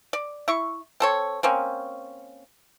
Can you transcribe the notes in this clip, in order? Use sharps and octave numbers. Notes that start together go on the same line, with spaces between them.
D5
E4 C#6
C4 A4 C#5
A#3 C4 C#4